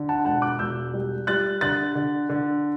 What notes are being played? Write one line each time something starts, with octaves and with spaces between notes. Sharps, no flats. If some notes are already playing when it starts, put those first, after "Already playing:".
Already playing: D3
F#5 A5
E1 F#5 A5
D6 F#6
E1 E6 G6
G3
G3 F#6 A6
D3 F#6 A6
D3
D3